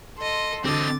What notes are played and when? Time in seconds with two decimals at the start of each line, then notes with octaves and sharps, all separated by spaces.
0.18 A4 D#5 C6
0.65 D3 C4 F#4 D#5 D6 A6